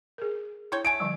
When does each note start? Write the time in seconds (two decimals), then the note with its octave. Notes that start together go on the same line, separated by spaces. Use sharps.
0.18 G#4 A#4
0.72 D4 E4 C#5 G5 C6
0.85 A3 C#5 G#5 D7
1.00 D3 F3 G3